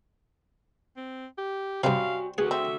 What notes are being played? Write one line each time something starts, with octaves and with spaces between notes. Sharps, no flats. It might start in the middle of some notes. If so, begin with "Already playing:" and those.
C4
G4
G2 C3 G3 C4 F#4 F5 G#5
A3 F#4 G#4 B4
C4 E5